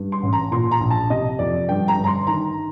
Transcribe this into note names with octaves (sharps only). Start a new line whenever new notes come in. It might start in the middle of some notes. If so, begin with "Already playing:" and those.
Already playing: G2
C6
A1
A#5
A#2 C6
A#5
A#1
A5
C3 D#5
F2 D5
G2 G5
A#5
G1
A#5
C6
D#3 A#5